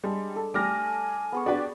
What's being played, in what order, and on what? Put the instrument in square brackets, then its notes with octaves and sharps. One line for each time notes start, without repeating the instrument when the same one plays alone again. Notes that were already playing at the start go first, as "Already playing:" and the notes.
[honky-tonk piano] G3 [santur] G#3 D4
[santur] A4
[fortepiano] G3 A3 [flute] G#5 [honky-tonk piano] D6 F6 A#6
[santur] B3 G#4 C#6
[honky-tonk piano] D4 G4 D5 [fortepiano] F#4 B4